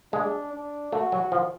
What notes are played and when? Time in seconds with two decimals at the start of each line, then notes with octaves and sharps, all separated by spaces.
0.13 G#3 D4
0.53 D4
0.92 A3 F#4
1.12 F#3
1.32 F3